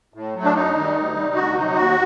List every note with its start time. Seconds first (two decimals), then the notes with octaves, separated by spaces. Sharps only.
0.14 A2
0.35 F#3 A3
0.45 D4
0.54 F#2 D#4
0.75 D#3 G3
0.95 D2
1.15 C3 G3
1.35 D2 F#4
1.55 C3 F#3 D#4
1.76 D#2 F#4